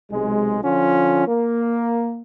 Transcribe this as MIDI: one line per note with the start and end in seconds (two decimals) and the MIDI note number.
0.11 0.58 35
0.11 0.58 48
0.11 0.58 56
0.64 1.26 50
0.64 1.26 53
0.64 1.26 61
0.64 1.26 65
1.27 2.22 58